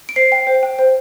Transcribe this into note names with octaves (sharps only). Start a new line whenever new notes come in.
D7
C5 C7
G5
C5
G5
C5